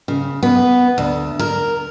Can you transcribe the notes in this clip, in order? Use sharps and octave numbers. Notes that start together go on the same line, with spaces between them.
C#3
B3
D2
A#4